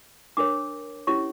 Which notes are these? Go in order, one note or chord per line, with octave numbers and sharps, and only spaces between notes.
D4 A#4 C#5 D6
C#4 E4 G4 C#5 C#6